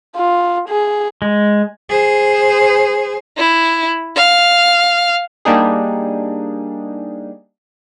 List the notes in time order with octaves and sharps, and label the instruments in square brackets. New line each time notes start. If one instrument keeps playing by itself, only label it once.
[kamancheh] F4
G#4
[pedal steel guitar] G#3
[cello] G#4 C5
[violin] E4
F5
[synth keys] G3 A#3 D4 D#4 G#4